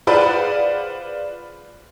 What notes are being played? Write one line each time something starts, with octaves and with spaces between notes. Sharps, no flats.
F4 G#4 B4 C5 D5 F#5